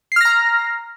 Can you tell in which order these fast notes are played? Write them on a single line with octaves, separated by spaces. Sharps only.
C7 F6 A#6 A#5